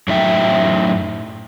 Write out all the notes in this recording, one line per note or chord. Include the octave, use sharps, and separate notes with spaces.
F#2 A2 D#4 E5 G5